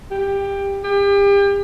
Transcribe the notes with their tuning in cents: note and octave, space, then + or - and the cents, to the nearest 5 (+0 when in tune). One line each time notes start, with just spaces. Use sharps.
G4 +15
G4 +35